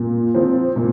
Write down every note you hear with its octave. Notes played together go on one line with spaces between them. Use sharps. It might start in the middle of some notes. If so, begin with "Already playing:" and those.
Already playing: A#2
F3 C4
A#2